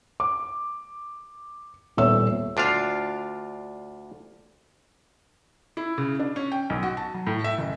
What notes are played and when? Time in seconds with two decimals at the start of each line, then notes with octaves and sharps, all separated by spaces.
0.20 D6
1.97 D#1 A#2 B3 C#5 E5 E6
2.57 D2 D4 F4 F5
5.77 E4
5.98 C#3
6.19 D4
6.36 C#4
6.52 G5
6.70 B1
6.83 F#4
6.97 A5
7.14 F#3
7.27 A2
7.44 E5
7.58 F#1